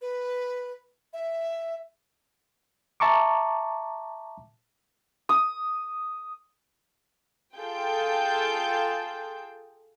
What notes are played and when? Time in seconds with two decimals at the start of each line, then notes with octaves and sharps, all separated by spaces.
0.02 B4
1.13 E5
3.00 E5 A5 A#5 C#6 D6
5.29 D#6
7.57 F4 G#4 A4 G5 G6